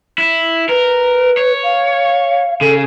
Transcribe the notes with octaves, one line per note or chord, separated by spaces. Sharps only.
E4
A#4 B4
C#5
F5
C#3 A4